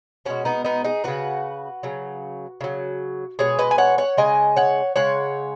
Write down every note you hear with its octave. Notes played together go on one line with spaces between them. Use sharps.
B2 G#3 C#4 F#4
B3 D#4
B3 D#4
D#4 G#4
C#3 F#3 F#4 B4
C#3 F#3
C#3 F#3
B2 G#3 G#4 C#5
B4 D#5
G#5
C#5 F#5
C#5 F#5
C#3 G#3 D#5 G#5
C#5 F#5
C#3 G#3 C#5 F#5